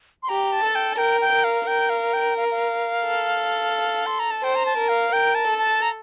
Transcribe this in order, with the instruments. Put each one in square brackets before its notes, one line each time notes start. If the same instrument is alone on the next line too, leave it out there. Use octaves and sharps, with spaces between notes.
[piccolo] C6
[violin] G4 [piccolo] A#5
[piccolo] A5
[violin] A4
[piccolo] G5
A5
[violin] A#4 [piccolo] G5
[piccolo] G5
[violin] A#4
[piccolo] F5
[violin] A#4 [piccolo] G5
[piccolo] F5
G5
F5
F5
[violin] A4
[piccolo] C6
A#5
A5
[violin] C5 [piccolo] G5
[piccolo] A#5
A5
[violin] A#4
[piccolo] F5
[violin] A#4 [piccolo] G5
[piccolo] A5
[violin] A4
[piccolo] A5
A#5